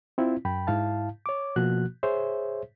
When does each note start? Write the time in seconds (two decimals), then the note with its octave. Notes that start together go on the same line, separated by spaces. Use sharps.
0.18 C4 E4 F4
0.45 F#2 G5 B5
0.67 G#2 E4 F5 A5
1.26 C#5 D6
1.56 B2 F3 A#3 F#4 F#6
2.03 G#4 C5 C#5 E5